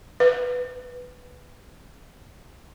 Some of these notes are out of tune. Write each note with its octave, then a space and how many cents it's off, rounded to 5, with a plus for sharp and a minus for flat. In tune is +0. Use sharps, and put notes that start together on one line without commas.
B4 +5